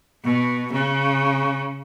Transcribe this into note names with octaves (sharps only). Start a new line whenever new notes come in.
B2
C#3